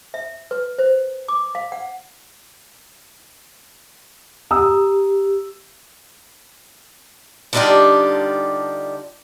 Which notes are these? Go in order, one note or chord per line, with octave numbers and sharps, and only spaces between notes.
E5
B4
C5
D6
F5
F#5
G4 A#5 D#6 E6
D3 G3 D4 D#4 F4 G4